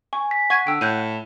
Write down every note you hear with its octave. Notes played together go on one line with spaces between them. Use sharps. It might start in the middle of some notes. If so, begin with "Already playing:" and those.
G#5 C#6
B6
F#5 C#6 G#6 D#7
D3 G5 E6
A2 F#6 G6 D#7